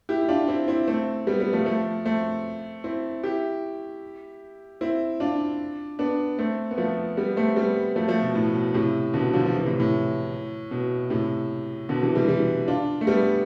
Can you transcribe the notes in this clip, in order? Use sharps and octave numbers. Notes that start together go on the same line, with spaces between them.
E4 G4
E4
D4 F4
C4 E4
C4 E4
A3 C4
G3 B3
G3 B3
F3 A3
F3 A3
A3 C4
C4 E4
E4 G4
C4 E4
D4 F4
B3 D4
A3 C4
B3
F3 A3
G3 B3
A3 C4
G3 B3
F3 A3
F3 A3
B2
A2
B2
A2 C3
B2 D3
D3 F3
F3
C3 E3
A2 C3
A2
B2
A2 C3
B2 D3
C3 E3
E3 G3
E3 G3
D4 F4
A3
G3 B3